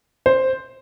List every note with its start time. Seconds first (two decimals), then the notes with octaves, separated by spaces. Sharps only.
0.26 C5